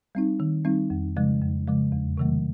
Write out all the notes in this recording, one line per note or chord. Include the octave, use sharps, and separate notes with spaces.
G3 C4 D#4
D#3
G3 C4 D#4
F2
C#3 F3 G#3
F2
C#3 F3 G#3
E2
C3 D#3 F#3 A3